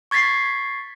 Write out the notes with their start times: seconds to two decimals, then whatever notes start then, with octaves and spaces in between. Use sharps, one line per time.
0.11 C#6 G#6 A6 B6 C7